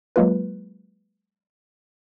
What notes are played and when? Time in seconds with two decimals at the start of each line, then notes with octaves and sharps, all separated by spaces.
0.16 F#3 G#3 A#3 F4 B4